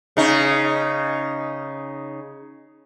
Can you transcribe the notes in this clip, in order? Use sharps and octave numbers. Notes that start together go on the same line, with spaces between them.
C#3 D#4